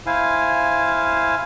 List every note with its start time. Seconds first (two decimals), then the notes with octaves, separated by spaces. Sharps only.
0.06 E4 C5 F5 G#5